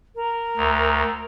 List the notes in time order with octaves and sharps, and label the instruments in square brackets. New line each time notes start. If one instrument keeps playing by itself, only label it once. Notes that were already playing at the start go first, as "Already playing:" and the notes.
[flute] A#4
[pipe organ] D2